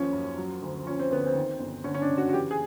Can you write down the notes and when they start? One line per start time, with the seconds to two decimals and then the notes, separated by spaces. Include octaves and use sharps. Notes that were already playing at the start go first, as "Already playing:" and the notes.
Already playing: D#2 F3 C#4
0.13 F#2
0.38 F#3
0.62 D2
0.86 F3 C#4
0.99 C4
1.11 D2 B3
1.26 C4
1.35 D#3
1.60 G1
1.84 D3 C#4
1.94 C#4
2.02 D4
2.09 F#1
2.18 F#4
2.29 F#4
2.33 E3 G4
2.51 G#4